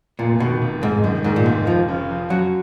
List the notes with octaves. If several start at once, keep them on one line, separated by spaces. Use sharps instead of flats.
F1 A#2
B2 D#3
F1
F1 G#2
F#2 D#3
G#2 D#3
A#2
F1 G#2
F1 F3
C#3
F3
F#2 F#3